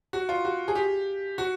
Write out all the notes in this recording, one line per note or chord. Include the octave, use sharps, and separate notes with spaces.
F#4
F4
F#4
G#4
G4
F#4